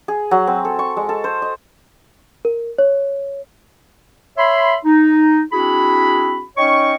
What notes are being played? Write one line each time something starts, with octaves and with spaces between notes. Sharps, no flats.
G#4
F#3
C4
A4
C#6
G#3
A4
C5
D#5
A#4
C#5
C#5 E5 B5 C6
D#4
C4 D4 E4 F#4 G#4 B5
C#4 D#4 C#5 D#5 G5 C#6